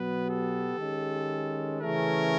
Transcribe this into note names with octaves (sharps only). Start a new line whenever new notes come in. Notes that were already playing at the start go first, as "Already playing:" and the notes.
Already playing: B2 F#3 B3 B4
G4 A4
D#3 G#3 C#4
C#3 E3 A3 C#4 G#4 A#4